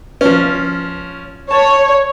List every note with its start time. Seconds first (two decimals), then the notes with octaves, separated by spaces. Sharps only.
0.21 F3 C#4
1.51 C#5 A5